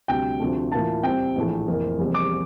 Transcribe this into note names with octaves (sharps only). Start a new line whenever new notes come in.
D2 C3 G3 G5
D2 C3 F3 A3
A2 E3 A#3 F4 A5
C2 C3 G3 C4 G5
A#1 A2 E3 A3
F1 F2 E3 A#3
F1 E2 C3 G3 A#3
D6